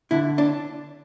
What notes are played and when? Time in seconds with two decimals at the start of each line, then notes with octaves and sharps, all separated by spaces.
0.11 D3 E4
0.38 D4